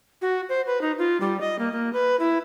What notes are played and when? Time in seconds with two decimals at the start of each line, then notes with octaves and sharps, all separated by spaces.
0.22 F#4
0.49 C5
0.67 B4
0.81 D#4
0.98 F4
1.21 G3
1.41 D#5
1.59 A#3
1.72 A#3
1.93 B4
2.19 E4